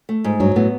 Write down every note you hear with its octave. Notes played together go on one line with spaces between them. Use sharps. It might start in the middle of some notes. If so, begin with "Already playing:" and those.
A3
G#2
G2 F#3
A2 B3